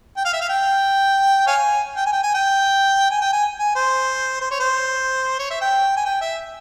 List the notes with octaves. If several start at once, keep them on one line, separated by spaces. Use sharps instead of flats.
G5
F5
E5
F5
G5
C#5 F5 G#5
G5
G#5
G5
G#5
G5
G#5
G5
G#5
G#5
C5
C5
C#5
C5
C#5
E5
G5
G#5
G5
E5